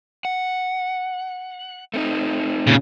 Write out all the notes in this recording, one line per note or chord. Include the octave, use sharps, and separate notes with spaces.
F#5
A3 C4 D#4
A#2 C#3